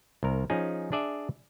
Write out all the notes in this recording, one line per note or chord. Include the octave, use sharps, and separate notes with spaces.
C2 A#4
F3 C#4 D#4 G#4
D4 G#4 D5 E5